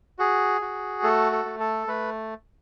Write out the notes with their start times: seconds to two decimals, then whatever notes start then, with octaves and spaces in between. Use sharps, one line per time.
0.19 F#4 G#4
0.61 F#4
1.03 A3 A4
1.32 A4
1.45 A3
1.60 A4
1.87 A3 B4